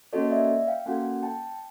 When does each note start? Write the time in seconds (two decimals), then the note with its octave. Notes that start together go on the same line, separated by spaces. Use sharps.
0.13 A#3 C#4 F#4 A4 C#5 D#5
0.31 D5 E5
0.67 F5 G5
0.86 A#3 C#4 F#4 A4 F#5 G#5
1.23 G5 A5